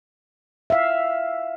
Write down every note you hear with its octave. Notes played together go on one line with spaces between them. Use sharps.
E5 F5